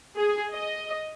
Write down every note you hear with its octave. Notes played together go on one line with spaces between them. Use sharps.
G#4
D#5